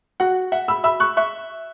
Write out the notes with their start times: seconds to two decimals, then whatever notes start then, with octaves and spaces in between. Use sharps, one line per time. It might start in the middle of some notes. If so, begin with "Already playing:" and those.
0.20 F#4 F#5
0.52 E5 F#5
0.68 B5 E6
0.84 E5 B5 E6
1.00 C#6 F#6
1.17 E5 C#6 F#6